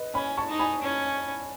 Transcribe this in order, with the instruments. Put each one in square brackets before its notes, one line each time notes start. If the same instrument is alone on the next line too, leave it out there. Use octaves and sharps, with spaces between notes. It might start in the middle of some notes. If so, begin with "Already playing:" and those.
Already playing: [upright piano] B4 D#5
[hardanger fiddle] C#4 [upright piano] G#5 B5
[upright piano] A5 C#6
[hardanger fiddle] D#4
[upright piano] G#5 B5
[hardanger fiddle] C#4